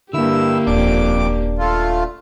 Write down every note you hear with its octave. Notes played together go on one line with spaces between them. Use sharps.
G2 D3 A#3 E4 G4 E6
D#1 F2 D4 D6
A3 F4